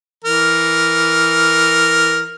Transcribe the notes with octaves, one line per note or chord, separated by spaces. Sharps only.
E3 A#4